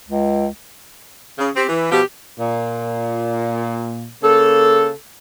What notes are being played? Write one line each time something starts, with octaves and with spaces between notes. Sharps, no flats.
C#2
C#3
C4 G4
E3
B2 F3 G4
A#2
C#3 A#3 A4